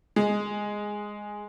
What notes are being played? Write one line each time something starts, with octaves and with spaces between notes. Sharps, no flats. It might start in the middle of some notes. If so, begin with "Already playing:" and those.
G#3